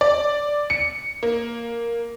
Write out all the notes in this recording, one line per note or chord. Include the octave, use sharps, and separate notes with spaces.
D5
C#7
A#3